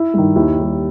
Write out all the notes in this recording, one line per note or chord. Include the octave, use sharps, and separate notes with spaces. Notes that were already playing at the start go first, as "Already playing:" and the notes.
Already playing: E4
G2 D#3
D#2 E4
D#3 G3